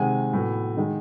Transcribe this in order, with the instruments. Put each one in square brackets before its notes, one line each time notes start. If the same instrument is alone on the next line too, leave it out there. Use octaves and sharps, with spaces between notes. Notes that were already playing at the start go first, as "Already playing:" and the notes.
Already playing: [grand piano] C3 D#3 G#3 F#5 G#5
A2 F#3 B3
D#3 G#3